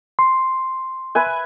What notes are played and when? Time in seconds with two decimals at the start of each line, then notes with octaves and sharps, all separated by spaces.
0.19 C6
1.15 B4 E5 G#5